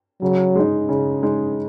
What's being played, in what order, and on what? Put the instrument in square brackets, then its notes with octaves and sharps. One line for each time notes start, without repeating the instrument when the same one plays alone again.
[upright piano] C#3 [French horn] F#3
[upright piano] G#3 D#4
C#3
G#3 D#4